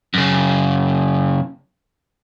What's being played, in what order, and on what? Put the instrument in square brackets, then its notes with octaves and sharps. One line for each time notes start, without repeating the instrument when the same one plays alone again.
[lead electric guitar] F#2 C#3